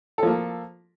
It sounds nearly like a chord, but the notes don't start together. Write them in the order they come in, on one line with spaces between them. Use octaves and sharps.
A4 F3 A#3